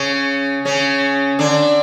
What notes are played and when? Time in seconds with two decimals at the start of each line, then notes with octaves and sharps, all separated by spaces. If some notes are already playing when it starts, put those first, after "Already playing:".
Already playing: C#3 C#4
0.65 C#3 C#4
1.39 D3 D4